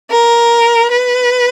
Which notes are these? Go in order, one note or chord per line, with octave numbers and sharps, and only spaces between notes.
A#4
B4